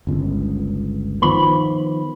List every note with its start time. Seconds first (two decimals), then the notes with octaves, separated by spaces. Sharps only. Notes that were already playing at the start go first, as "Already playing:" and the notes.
0.07 G1 C#2
1.22 D#3 F3 B3 B5